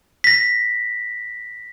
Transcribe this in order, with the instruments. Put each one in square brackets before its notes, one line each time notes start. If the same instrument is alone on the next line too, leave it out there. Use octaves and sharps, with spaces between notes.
[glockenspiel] A#6 B6